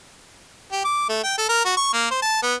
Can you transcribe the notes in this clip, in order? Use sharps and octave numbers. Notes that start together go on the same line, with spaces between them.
G4
D6
A3
G5
A4
A#4
F#4
C#6
A#3
C5
A5
B3